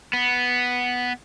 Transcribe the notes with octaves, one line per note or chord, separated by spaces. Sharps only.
B3